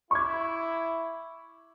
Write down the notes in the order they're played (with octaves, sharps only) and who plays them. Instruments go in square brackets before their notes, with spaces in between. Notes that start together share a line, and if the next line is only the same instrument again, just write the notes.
[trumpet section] E4 [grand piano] C#6 D6 G#6